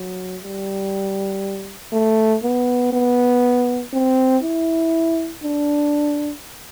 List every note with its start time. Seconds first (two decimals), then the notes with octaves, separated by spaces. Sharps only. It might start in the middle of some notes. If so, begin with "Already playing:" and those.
Already playing: F#3
0.43 G3
1.92 A3
2.43 B3
2.93 B3
3.93 C4
4.43 E4
5.43 D4